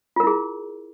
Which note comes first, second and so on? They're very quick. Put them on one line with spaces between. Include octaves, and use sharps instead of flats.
F4 A#4 E4 G#4